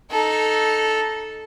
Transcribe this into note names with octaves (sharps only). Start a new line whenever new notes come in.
D#4 A4